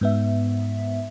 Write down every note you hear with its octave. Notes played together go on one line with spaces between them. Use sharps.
G#2 B3 E5